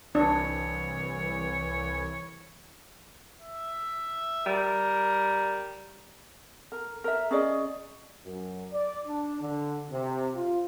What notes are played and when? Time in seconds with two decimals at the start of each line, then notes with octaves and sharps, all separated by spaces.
0.15 C2 E3 D4 C#5
3.41 E5
4.46 G3 A#4
6.72 A#4
7.04 A#4 E5
7.31 C#4 G#4 D5 D#5
8.23 F#2
8.70 D5
9.05 D4
9.40 D3
9.89 C3
10.33 F4